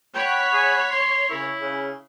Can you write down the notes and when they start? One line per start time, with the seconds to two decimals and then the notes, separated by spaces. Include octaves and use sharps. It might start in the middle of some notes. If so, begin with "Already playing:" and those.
0.15 C#5 F#5 G5 B5
0.53 G#4
0.91 C6
1.30 C#3 E4 A#4
1.61 C#3